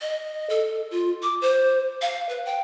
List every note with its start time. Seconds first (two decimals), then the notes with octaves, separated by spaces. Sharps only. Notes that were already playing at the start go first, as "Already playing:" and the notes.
0.01 D#5
0.50 A4
0.91 F4
1.22 D6
1.41 C5
2.02 F5
2.29 B4
2.45 G5